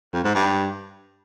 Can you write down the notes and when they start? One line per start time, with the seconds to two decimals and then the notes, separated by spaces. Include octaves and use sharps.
0.13 F2
0.24 G#2
0.35 G2